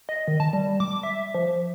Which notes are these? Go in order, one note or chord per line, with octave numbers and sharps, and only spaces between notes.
D#5
D#3
A5
G3
D6
E5
F3